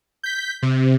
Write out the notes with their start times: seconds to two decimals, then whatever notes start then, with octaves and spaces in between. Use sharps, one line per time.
0.23 G6 B6
0.63 C3